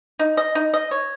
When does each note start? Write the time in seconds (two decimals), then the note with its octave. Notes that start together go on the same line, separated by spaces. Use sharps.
0.19 D#4
0.37 D#5
0.55 D#4
0.74 D#5
0.91 C#5